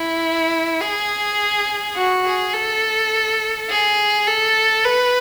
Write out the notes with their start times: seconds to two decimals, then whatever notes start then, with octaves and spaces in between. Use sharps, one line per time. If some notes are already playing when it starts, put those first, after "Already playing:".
Already playing: E4
0.81 G#4
1.96 F#4
2.25 G#4
2.54 A4
3.70 G#4
4.27 A4
4.85 B4